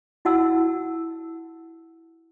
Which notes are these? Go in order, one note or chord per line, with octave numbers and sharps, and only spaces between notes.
E4 F#4 F#5 A5 E6